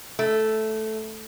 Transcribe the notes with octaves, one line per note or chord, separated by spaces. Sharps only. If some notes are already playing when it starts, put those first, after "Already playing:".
A3